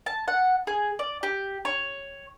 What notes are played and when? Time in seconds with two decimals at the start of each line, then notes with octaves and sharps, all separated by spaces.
0.06 A5
0.28 F#5
0.67 G#4
0.99 D5
1.23 G4
1.65 C#5